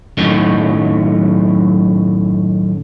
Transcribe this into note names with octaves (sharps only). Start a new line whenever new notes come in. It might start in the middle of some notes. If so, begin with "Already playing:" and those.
F#2 A2 D#3 F#3